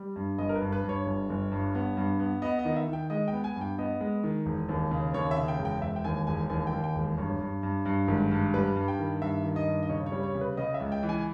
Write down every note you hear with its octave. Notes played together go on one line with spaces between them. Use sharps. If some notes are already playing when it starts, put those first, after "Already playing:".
Already playing: G3
G2
G1 D#5
A#4
B4
G2
B4
G2
C#5
G1
G1
G2
B3
G2
B3
B3 D#5
D#5
D#3
E5
D#3
G5
G#3 D#5
B3 G5
G#5
G2
G5
B3 D#5
G#3
D#3
E1
D#2
C#3
D#2 C#5
E5
C#3
G5
E1
G5
E1 E5
G5
D#2 G#5
E1 G#5
D#2 G#5
G5
D#2
G5
E1
G2 C#5
G2
G2
G2
G#1
G2
G3 B4
G2
G5
D#3
G2 E5
D#3
D#5
G2
D#5
C#3 C#5
C#5
G3
C#5
C#3
B4
C#3 D#5
E5
C#2
G5
E3
G#5